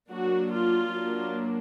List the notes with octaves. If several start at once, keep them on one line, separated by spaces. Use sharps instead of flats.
F#3 A#3 D4 F#4
F4
F#3 A#3 D4